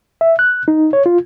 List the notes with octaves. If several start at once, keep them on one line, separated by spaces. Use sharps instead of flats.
E5
F#6
D#4
C#5
F4